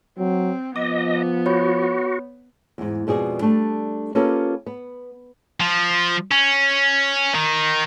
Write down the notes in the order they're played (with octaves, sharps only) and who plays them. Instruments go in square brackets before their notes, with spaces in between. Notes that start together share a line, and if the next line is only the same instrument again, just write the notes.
[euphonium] F#3 [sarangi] C4
[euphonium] F3 [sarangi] B3 [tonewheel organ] D#5 [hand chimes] D6
[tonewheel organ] F#4 [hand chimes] C#5 B5
[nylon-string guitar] E2 G#2
F2 B2 G#3 G#4 D5
G3 A3 D4
A#3 C#4 F4 G4 A4 B4
B3
[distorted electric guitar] F3
C#4
D#3